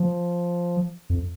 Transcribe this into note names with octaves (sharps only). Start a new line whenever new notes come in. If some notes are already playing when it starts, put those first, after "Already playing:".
Already playing: F3
F2